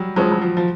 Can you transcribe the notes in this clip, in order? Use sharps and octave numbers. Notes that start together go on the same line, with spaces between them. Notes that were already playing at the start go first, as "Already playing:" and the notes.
Already playing: F#3 G3
F3 F#3 G#3 C#4
F#3
F3
F3